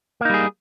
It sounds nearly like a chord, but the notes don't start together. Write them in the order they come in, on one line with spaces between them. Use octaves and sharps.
A#3 D#4 G3 G#4